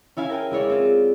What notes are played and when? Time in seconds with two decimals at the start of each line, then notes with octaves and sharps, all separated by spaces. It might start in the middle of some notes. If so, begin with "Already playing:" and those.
0.17 C#4 E4 F5 G#5
0.30 A#4 G5 G#5
0.51 G#3 E4 C#5 D5
0.69 C4 F4